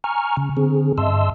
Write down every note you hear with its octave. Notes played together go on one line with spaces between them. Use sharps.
G#5 A#5 C#6 F6
C#3
D3 C4 G#4
G2 D#5 E5 A5 C6 E6